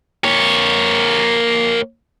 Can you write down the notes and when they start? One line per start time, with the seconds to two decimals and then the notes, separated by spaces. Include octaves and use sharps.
0.24 A#3 C#5